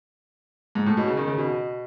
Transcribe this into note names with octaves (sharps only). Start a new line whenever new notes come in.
G#2
A2
B2
C#3
D#3
C#3
B2